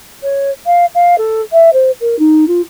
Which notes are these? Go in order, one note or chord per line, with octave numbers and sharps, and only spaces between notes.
C#5
F5
F5
A4
E5
C5
A#4
D#4
F4